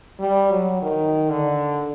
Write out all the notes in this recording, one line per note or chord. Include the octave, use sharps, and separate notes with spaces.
G3
F#3
D#3
D3